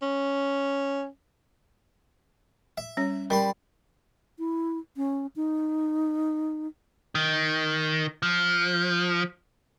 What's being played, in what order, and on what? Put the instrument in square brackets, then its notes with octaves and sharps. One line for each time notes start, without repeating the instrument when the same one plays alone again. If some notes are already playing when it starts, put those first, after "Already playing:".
[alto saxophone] C#4
[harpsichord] E5
[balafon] G3 C#4 C#5
[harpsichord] G3 B5 C6 [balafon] A#4
[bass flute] E4
C#4
D#4
[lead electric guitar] D#3
F3